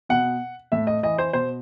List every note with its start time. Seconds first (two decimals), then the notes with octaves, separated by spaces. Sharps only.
0.09 B2 F#5
0.72 A2 E5
0.87 D#5
1.03 E3 D#5
1.18 C5
1.33 B2 C5